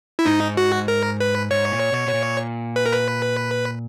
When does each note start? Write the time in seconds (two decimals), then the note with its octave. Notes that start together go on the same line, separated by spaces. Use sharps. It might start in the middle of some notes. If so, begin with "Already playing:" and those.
0.19 E4
0.26 G#2 D#4
0.57 F#4
0.88 A#4
1.20 B4
1.51 G#2 C#5
1.72 A#2
1.92 B2
2.07 B2
2.14 A#2
2.76 B4
2.86 A#4
2.93 B4